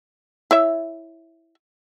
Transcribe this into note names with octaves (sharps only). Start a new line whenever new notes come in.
E4 C#5 E5